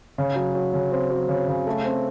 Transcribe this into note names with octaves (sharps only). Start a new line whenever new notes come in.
C#3
F#3
F#3
C#3
C4
F#3
C#3
C#3
A3
C4